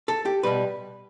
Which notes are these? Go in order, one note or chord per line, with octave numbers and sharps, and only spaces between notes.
A4
G4
B2 G3 B4